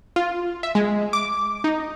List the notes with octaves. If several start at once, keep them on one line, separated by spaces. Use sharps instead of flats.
F4
E5
G#3
D6
D#4